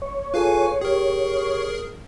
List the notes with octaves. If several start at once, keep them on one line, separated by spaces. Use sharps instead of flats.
C#5
F4 G#4 A4 B4 F5 G#5
G4 G#4 A#4